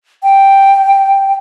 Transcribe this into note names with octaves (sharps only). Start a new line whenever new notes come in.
G5